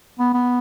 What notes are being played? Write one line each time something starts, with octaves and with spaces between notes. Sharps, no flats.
B3
B3